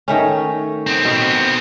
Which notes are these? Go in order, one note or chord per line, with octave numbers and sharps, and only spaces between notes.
D#3 A3 C#4
B3 C4
B2